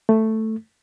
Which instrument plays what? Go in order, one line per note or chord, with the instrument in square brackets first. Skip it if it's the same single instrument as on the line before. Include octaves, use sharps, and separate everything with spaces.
[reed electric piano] A3